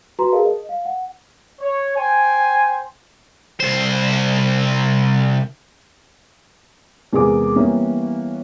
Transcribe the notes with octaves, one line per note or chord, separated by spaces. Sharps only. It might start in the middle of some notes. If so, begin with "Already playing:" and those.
F#4 B4 A#5 C6
G#4 A#4 D#5 F5 A5
D#5
F5
F#5
C#5
C5 G5 G#5
C2 C5
E2 C3 G#3 A#4 G#5 D6
E3 G3 A#3 B3 C#4